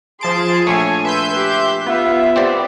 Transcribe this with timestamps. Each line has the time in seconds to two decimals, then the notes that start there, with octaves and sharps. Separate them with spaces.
0.21 F3 G#4 A5 C6 D7
0.67 A#1 A3 C#5 G#5
1.05 B4 E5 C6 G6
1.35 G4 F#6
1.86 B3 F4 E5
2.36 C4 G4 D5